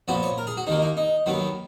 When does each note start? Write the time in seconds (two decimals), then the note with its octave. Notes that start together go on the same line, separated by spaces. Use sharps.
0.08 A#2 F3 B3 F#4
0.23 C#5
0.38 A#4
0.47 G#4
0.57 F#4
0.67 D#2 D#3 A#3 D#4
0.82 D#4
0.97 D#4
1.26 D#2 D#3 F#3 B3